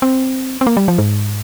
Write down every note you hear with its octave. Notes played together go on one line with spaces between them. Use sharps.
C4
C4
A#3
G3
F3
G#2